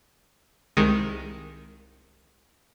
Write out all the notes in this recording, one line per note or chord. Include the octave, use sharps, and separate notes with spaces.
C2 D#3 G#3